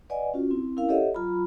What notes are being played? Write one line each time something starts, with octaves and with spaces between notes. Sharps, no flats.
B4 D5 D#5 F#5 G#5
C#4 F4 F#4
C4 E4
C#4 E4 A#4 F5
G4 A4 C#5 D#5 E5 F#5
F#3 F4 A#5 B5